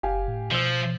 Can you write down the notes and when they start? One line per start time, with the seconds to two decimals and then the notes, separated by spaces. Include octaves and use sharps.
0.03 F#1 G4 F5 G#5
0.28 A2
0.51 B2 F3 C5 E6